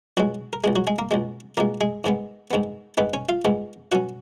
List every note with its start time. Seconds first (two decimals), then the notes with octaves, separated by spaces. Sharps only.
0.17 C#2 B2 F#3 G#3 F#4
0.53 A#4
0.64 C#2 B2 G#3 G#4
0.76 F#3 F#4
0.87 G#3 G#4
0.99 A#3 A#4
1.11 C#2 B2 G#3
1.57 C#2 B2 G#3 A#3 A#4
1.81 G#3 G#4
2.04 G#2 D#3 G#3 B3
2.51 G#2 D#3 G#3 B3
2.97 G#2 D#3 G#3 B3 B4
3.14 C#4 C#5
3.29 F4 F5
3.45 G#2 D#3 G#3 B3
3.92 B2 F#3 C#4 F#4 F#5